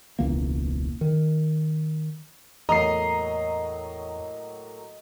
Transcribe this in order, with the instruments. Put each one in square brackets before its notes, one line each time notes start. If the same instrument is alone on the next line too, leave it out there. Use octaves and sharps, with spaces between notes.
[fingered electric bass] E1 C#2 E3 A#3
D#3
[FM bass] E2 [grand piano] A2 F#3 A#3 [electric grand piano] D#5 D#6 C7 [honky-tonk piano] A#5